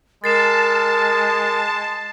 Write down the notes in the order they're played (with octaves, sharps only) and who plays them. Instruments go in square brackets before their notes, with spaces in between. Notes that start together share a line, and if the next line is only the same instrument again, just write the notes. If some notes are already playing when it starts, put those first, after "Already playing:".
[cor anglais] G#3 [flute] A#4 [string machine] A5 [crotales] A6 C7 E7